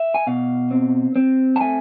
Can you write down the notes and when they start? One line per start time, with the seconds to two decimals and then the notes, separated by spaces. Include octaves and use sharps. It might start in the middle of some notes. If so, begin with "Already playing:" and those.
Already playing: E5
0.14 G#5
0.27 B2 F5
0.71 C4
1.16 C4
1.56 A5
1.60 A3 G#5